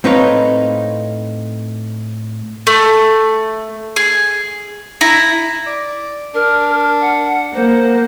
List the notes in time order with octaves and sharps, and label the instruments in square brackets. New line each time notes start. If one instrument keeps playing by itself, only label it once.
[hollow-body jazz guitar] A2 C4 D#4 B4 C#5 F5
[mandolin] A3
G#4
E4 A#5
[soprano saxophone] D5
[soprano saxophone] D4 [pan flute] A#4
[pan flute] F#5
[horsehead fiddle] A#3 [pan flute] C5 [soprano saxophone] F#5